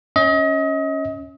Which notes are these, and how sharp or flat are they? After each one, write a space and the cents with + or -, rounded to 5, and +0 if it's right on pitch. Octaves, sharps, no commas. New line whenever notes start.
C#4 +0 D#5 +35